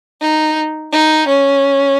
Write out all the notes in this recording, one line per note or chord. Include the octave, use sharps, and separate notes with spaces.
D#4
D#4
C#4